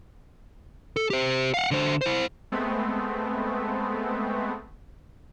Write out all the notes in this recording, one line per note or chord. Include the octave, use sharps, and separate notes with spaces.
A4
G4 C5
F5 F#5
D3 C5
E4 C5
G#3 A3 B3 C4